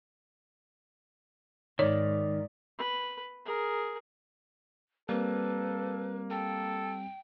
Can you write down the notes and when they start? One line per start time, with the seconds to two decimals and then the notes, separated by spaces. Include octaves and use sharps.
1.79 G#2 D#3 C#5 D5
2.78 B4
3.45 G#4 A#4
5.09 G3 A#3 C4 A4 B4
6.31 A4 G5